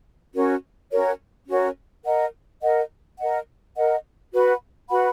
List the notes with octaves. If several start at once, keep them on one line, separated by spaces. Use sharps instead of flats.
C#4 F#4 A#4 C#5
C#4 F#4 A#4 C#5
C#4 F#4 A#4 C#5
A#4 D#5 F#5
A#4 D#5 F#5
A#4 D#5 F#5
A#4 D#5 F#5
F#4 B4 F#5 B5
F#4 B4 F#5 B5